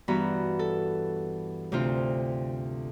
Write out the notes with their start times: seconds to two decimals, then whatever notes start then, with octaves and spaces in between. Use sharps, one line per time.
0.08 G2 E3 B3 F#4 A#5 B5
0.59 A4
1.72 D2 C3 C4 F4